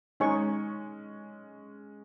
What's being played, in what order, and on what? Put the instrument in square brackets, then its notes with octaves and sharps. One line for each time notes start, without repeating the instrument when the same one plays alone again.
[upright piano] G#3 C#4 [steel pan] D#4 G#4 C#5 G#5 C#6